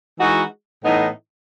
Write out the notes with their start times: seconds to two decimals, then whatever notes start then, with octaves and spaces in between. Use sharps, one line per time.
0.19 E3 G#3 D#4 F#4
0.84 A2 E3 B3 D#4